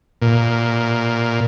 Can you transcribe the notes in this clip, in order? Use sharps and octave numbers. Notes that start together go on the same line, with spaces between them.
A#2